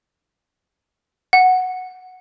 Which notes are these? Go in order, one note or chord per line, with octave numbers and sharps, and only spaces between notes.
F#5